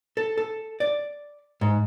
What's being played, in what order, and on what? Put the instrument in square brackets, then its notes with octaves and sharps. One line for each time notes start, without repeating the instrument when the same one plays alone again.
[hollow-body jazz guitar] A4
A4
D5
G#2